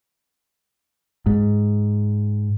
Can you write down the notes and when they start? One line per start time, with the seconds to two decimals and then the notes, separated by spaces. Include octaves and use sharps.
1.26 G#2